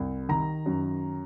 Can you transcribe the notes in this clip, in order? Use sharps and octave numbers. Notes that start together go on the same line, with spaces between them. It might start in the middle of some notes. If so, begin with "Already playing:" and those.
Already playing: C2
D#3 A#5
F#2